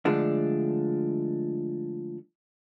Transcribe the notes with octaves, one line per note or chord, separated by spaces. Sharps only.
D3 F3 G#3 A3 D4